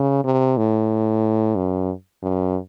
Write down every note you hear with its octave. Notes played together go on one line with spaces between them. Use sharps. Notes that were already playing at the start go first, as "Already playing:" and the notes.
Already playing: C#3
C3
A2
F#2
F#2